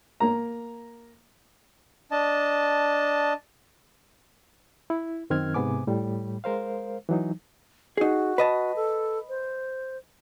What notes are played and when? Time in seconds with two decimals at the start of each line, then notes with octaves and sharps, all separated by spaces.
0.20 A#3 A#5
2.11 D4 D#5 A5
4.90 E4
5.30 F#2 D#3 C4 F6 G#6
5.54 G#2 C3 B3 G#5 D6
5.87 A2 G3
6.44 G#3 A#4 C5 F5
7.09 E3 F#3 D#4
7.97 D#4 F#4 G#4
8.38 B4 D#5 A5
8.76 A4
9.29 C5